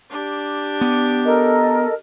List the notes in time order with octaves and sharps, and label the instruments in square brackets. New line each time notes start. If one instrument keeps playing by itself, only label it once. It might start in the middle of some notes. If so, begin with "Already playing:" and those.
[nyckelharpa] D4 G4
[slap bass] B3
[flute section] A4 A#4 D#5